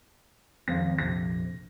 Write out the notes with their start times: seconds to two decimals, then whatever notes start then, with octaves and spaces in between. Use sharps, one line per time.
0.68 G#1 F2 F3 C4 F5 A#6
0.99 A#1 F2 C3 A#6